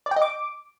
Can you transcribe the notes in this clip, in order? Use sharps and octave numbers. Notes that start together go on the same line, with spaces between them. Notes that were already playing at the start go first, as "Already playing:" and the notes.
D5
G5
D#5
D6